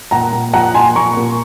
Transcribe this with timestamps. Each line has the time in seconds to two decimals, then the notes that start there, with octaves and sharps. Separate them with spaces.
0.11 A#2 F#5 A#5
0.33 A#2
0.53 F3 F#5 A#5
0.74 A#2 G#5 C6
0.95 A#2 A#5 C#6
1.17 A#2